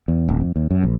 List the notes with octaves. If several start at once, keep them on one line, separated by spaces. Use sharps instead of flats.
E2
D1
F2
D#2
F#2
A#1